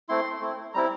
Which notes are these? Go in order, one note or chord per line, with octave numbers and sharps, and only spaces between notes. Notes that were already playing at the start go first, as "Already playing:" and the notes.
A3 C4 E4 C6
A3 C4 E4
G3 C4 E4 A#5